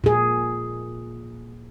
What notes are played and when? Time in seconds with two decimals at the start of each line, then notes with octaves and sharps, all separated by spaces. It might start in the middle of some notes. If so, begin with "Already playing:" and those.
0.04 A#2 G#4